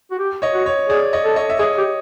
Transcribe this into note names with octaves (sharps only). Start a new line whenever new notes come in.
F#4
G4
C#5 D#5
F#4
C#5
G#4 D5
C#5 D#5
A4
C#5 D#5
E5
G#4 C#5 D#5
G4